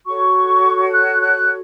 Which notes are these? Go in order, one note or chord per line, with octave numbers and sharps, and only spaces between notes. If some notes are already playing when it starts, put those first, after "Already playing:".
F#4 A4 C#5 C#6
F#6
F#6